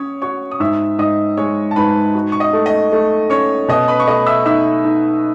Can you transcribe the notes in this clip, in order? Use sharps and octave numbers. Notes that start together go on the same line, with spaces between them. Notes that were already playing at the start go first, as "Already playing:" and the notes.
Already playing: C#4 C#5 D#6
F#4 C#5 C#6
D#6
G#2 E5 E6
G#2 D#5 D#6
G#3 C#5 C#6
A5
G#2 B4 B5
F#4
C#6
D#5 D#6
A3
D#5 D#6
A3
C#4 C#5 C#6
B2 D#5 D#6
B4 B5
C#6
A3 D#5 D#6
E5 E6
D#4 E5 E6
D#4